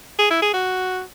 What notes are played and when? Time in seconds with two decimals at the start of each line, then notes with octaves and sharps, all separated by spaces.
0.19 G#4
0.31 E4
0.42 G#4
0.54 F#4